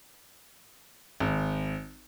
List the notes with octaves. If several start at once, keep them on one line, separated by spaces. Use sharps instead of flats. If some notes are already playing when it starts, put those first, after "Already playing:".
G#1